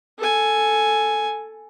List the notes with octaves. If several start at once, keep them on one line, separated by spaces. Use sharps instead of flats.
A4 G#5